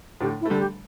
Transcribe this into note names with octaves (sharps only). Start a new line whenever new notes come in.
A2 D3 G4
E4
A3
D3 G3 A4
G4